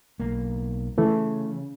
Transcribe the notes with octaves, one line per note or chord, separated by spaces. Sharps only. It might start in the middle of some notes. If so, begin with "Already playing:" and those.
B1 A#3
C#3 E3 A3